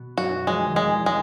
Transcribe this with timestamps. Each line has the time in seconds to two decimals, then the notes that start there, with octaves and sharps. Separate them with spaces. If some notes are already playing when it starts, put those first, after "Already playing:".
Already playing: B2 B3
0.17 F#2 F#3 F#4
0.47 F3 G#3
0.56 E3
0.65 D#3
0.74 E2 E3 G#3
1.06 G#3